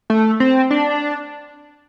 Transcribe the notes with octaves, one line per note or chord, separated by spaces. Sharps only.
A3
C4
D4